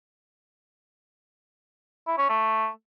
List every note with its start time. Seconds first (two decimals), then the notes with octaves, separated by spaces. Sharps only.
2.07 E4
2.18 C#4
2.29 A3